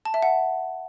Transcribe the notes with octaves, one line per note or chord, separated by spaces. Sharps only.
A5
E5
F#5